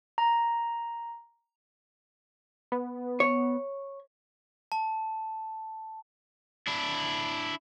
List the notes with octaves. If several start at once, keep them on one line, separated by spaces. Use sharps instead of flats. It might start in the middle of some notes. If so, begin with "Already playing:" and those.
A#5
B3
C#5
A5
D4 E4